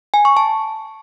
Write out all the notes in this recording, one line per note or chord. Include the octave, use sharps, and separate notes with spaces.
G#5
C#6
A5